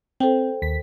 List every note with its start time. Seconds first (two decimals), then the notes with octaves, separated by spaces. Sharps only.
0.20 C4 A4 C5 G5
0.62 D#2 B6